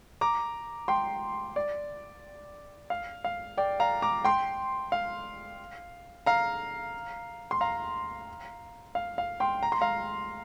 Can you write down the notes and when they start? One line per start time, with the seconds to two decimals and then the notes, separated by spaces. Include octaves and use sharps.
0.21 A#5 D6
0.88 G5 C6
1.56 D5
2.90 F5
3.24 F5
3.57 D5 G5
3.80 F5 A#5
4.02 A#5 D6
4.24 G5 C6
4.92 F5
6.26 F5 A#5
7.51 C6
7.61 F5 A#5
8.95 F5
9.18 F5
9.40 G5 C6
9.63 A#5
9.72 C6
9.81 F5 A#5